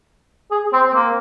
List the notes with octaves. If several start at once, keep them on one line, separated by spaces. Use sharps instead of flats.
G#4
C4
C4
A#3